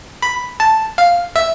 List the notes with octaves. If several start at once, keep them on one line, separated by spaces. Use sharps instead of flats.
B5
A5
F5
E5